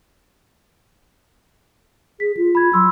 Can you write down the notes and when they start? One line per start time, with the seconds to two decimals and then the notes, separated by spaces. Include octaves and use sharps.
2.20 G#4 B6
2.37 F4
2.55 B5 G#6
2.73 F#3 B5 C6 E6